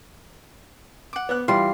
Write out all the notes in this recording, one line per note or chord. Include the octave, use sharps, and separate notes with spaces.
F#5 D6
B3 F#6
E3 G3 F4 C6